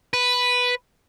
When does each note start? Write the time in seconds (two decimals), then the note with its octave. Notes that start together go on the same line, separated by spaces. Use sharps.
0.14 B4